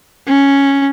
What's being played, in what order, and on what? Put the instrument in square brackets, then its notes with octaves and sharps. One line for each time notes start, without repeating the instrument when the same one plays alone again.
[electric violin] C#4